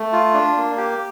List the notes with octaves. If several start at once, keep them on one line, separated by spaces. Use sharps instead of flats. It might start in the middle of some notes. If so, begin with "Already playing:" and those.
Already playing: A3
F4
D4
A#3
G4